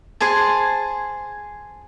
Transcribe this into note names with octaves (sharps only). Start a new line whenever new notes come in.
G#4 C5 G#5 A5